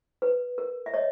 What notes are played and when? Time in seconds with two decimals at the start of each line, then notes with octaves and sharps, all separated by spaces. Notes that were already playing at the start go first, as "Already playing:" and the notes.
0.22 B4
0.58 A#4
0.86 E5
0.94 C#5 D#5